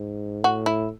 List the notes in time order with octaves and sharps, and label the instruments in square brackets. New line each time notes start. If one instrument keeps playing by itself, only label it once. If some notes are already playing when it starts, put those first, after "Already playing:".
Already playing: [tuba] G#2
[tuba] A2 [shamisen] F#4
[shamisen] E4